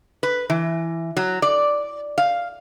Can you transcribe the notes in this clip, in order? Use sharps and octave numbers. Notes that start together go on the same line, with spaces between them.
B4
E3
F#3
D5
F5